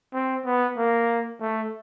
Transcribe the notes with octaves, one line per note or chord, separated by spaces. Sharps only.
C4
B3
A#3
A3